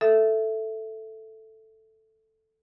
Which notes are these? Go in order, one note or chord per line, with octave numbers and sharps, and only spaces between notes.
A4 E5 D#6